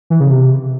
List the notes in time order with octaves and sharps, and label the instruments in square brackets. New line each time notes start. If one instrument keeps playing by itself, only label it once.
[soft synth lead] E3
C#3
C3